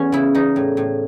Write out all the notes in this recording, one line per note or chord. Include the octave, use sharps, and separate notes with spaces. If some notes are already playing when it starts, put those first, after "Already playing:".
Already playing: E2 E3 C#4
C#3 E4
E2 D#4
A2
A2